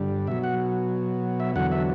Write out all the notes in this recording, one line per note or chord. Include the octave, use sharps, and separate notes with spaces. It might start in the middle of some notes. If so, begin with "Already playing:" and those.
Already playing: G2 D3 G3
B2 F#3 E5
F#5
E5
E2 D3 F#3 F#5
E5